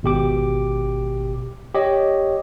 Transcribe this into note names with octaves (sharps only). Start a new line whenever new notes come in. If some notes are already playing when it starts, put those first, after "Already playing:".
G#1 B2 G4 D6
G4 C#5 D#5